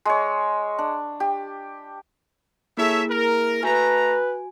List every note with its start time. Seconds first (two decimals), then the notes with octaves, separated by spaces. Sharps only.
0.05 G#3 C#5
0.79 D4
1.20 G4
2.77 A#3 E4 G#4 A4 C#5 E5
3.10 A#4
3.63 A3 F#4 B4 G#5 A#5